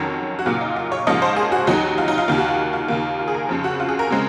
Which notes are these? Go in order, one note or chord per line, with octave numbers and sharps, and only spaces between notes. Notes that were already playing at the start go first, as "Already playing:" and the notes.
Already playing: F2 D#3 F#3 C#4 A#4
F#4
A#2 F#3 A#3 F4
D#4
F4
C#5
G#2 F3 A#3 C#4 D#5
C5
G#4
F#4
D#2 D#3 F#3 D#4
F4
D#4
F4
D#2 D#3 A#3 F4
F#4
F4
F4
D#2 D#3 A#3
F4
G#4
A#4
F2 C#3 F3
F#4
F4
G#4
A#4
C#3 G#3 C4